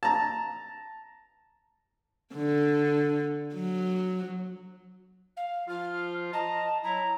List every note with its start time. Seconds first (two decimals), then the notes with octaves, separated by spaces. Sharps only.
0.03 A5 A#5
2.34 D3
3.55 F#3
5.37 F5
5.68 F3 F4 F6
6.33 D#5 A5 A#5
6.83 F#3 E4 A#5